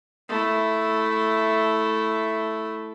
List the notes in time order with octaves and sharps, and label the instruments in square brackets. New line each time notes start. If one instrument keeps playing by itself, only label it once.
[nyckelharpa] A3 E4